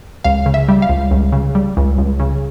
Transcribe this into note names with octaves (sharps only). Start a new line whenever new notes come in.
C#2 F5
C#3
E5
G3
F5
C#2
C#2
C#3
G3
C#2
C#2
C#3